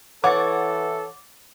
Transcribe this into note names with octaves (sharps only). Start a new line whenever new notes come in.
E3 A4 C#5 F#5 D6 A6